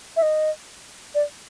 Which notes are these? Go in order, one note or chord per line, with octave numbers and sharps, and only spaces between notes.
E5
D#5
D5